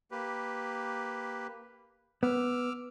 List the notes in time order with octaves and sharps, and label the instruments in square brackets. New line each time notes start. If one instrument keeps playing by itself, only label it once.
[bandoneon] A#3 G4 B4
[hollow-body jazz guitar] B3 [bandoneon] D6 E6 F6